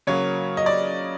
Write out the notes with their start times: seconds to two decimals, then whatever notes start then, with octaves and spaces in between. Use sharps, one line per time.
0.07 C#3 F#3 A#3 C#5
0.57 D#5
0.66 D5